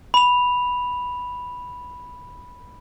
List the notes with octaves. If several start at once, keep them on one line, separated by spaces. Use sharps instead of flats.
B5 F7